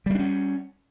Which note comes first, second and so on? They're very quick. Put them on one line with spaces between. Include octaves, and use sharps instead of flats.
G3 A3 D4 C#4